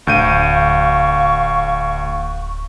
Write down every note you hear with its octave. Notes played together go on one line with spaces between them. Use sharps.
D1 D2 F5 C#6 G6 D#7